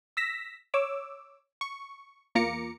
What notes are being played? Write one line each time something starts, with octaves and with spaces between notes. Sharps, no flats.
E6 A#6 B6
C#5 D6 E6
C#6
E2 A#3 F4 A#5 D6 C#7